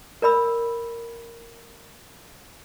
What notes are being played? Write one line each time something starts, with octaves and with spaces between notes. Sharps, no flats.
A#4 D5 B5 E6